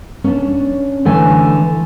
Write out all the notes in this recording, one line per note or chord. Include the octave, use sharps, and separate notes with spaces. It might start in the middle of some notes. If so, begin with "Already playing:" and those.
C#4 D4
D3 E3 A3 G#5